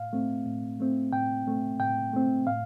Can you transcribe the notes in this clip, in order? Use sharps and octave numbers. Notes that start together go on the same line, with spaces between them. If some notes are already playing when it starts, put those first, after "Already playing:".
Already playing: A2 F5
A3 C4
A2
A3 C4
A2 G5
A3 C4
A2 G5
A3 C4
A2 F5